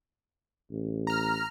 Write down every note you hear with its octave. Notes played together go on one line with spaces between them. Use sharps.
A1
A#5 F6